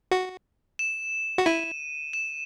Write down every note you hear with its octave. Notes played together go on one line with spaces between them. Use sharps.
F#4
E7
F#4
E4 D#7
E7